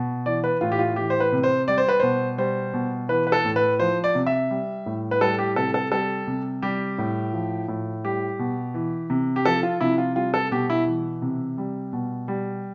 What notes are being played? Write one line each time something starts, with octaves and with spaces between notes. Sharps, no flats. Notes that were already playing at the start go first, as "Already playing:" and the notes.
Already playing: B2
E3 D5
B4
A2 F4
G4
F4
E3 G4
C5
B4
C3
C5
G3 D5
C5
B4
B2 C5
G3 C5
B2
E3 B4
B4
A4
A2
B4
F3 C5
D5
C3
E5
G3
A2
B4
G3 A4
G4
C3 A4
A4
G3 A4
C3
G3 G4
A2
F3
A2
G3 G4
B2
E3
C3
G4
F3 A4
F4
C3 E4
F4
G3 F4
A4
B2 G4
E4
E3
C3
G3
B2
G3